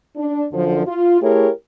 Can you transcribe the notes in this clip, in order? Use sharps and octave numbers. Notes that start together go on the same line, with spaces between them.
D4
F#2 D3 F3
F4
A3 E4 G4 G#4 A#4 C#5